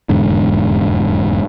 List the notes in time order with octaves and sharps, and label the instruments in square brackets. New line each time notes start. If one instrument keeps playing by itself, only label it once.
[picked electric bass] F1 E2 G#2 D3